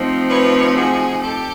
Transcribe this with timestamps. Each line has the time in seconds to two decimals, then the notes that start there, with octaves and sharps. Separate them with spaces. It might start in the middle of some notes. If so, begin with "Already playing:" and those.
Already playing: F3 A3 C4 D#4
0.29 B4 C#5
0.75 F#4 G#4
1.21 G4 A4